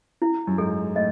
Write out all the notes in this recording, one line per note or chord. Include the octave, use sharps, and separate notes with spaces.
E4
F#2
G#2 A4
A2 D#5